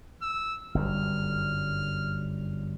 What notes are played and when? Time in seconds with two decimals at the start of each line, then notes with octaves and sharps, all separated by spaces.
0.22 E6
0.75 G1 F#2 G3 F6